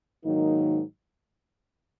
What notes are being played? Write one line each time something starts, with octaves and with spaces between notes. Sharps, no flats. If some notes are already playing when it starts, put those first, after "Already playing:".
G#2 D#3 F#3 A#3 D#4